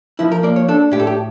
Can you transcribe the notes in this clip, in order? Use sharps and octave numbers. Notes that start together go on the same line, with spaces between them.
F3 E4
A#4
A#3 D5
C#5
D4 A4
A2 G4
A4
G4